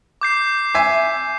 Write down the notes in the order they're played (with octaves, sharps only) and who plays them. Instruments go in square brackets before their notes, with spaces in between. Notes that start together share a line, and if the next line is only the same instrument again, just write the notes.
[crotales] D6 G6 C7
[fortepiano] E5 G#5